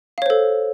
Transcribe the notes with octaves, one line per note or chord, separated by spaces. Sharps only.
A4 C5 C#5 F5